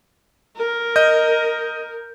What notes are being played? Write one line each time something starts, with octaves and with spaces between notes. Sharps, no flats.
A#4
D#5 G6